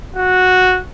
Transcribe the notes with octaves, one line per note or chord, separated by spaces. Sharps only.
F#4